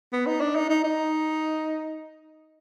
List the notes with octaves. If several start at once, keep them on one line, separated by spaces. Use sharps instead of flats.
B3
D#4
D4
D#4
D#4
D#4